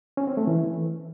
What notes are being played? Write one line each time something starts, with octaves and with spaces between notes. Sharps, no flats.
C#4
C4
A3
E3